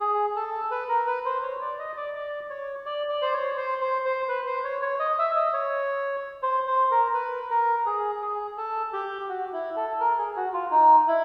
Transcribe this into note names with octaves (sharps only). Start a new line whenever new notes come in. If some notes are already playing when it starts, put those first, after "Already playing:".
G#4
A4
B4
A#4
B4
C5
C#5
D5
D#5
D5
D5
C#5
D5
D5
C5
C#5
C5
C5
C5
B4
C5
C#5
C#5
D#5
E5
D#5
C#5
C5
C5
A#4
B4
A#4
G#4
G#4
A4
G4
F#4
E4
A4
A#4
G#4
F#4
F4
D#4
E4